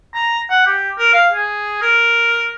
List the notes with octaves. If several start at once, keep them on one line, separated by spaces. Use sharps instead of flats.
A#5
F#5
G4
A#4
F5
G#4
A#4